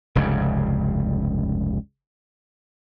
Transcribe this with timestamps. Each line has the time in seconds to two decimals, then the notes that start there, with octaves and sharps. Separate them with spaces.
0.15 F1 C#2 G2 C#3